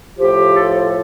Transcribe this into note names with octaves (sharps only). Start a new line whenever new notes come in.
A2 F3 G4
A4